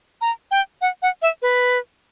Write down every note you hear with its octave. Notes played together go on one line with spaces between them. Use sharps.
A#5
G5
F#5
F#5
E5
B4